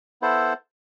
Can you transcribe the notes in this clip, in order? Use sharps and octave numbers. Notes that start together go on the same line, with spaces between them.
B3 E4 A4 C5